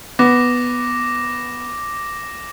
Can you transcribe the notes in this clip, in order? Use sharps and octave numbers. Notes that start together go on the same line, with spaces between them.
B3 D6 A#6 E7